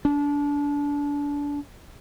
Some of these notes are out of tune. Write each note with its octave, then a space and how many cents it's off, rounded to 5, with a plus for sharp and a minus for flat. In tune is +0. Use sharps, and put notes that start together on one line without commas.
D4 -25